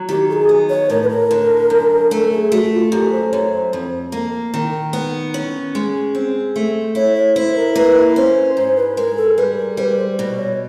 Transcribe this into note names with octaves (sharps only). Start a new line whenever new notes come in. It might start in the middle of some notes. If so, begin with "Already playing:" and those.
Already playing: F#3
D#3 G4
A4
G#4
B3
C#5
A2 A#4
B4
A#4
D3
F#2
A3 A4
A4
G#4
A3 F#4
F#4
F4
F#2 G4
C5
F#2 C#5
C5
F2
A#3
D#3
B3
C#4
G#3
C4
A3
E4 C#5
C#5
E4 C5
A#4
A#3 B4
C#4 C5
G#2 C5
B4
G#3 A#4
A4
G3 B4
A#4
G3 C5
B4
C5
B2
C#5